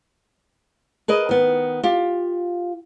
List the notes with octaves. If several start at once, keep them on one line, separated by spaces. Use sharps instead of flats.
G#4 A#4 B4 D#5
D#3 B3
F4 G4